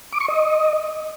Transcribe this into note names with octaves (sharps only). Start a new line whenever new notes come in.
D6
C#6
D#5